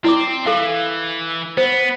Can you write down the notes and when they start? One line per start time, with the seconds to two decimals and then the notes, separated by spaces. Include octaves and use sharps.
0.04 C4 E4 D5 D6
0.46 E3 A4 F5
1.57 B3 C5